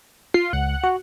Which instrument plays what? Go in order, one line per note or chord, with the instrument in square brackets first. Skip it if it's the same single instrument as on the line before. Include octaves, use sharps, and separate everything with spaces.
[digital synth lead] F4 [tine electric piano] C7
[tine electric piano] C#2 [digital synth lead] F#5
[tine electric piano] F#4